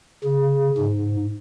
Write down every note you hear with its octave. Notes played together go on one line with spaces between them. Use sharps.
C#3
G#2